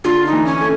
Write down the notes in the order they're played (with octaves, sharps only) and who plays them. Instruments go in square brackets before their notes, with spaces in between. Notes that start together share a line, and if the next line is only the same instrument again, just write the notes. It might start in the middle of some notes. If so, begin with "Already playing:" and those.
[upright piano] D3 [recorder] F4
[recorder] D#4
[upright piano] E3
[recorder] C#4
[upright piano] A3